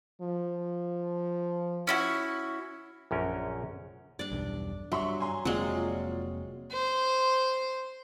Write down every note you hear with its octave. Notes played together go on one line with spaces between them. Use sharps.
F3
C#4 E4 F#4
A#1 F#2 C#4 A#4
G2 D4 D5
B1 E2 G2
G2 F#3 E5 C6 C#6
G#5 A#5 C6
F1 F#3 G#3 A#3 C4 F4 D5
C5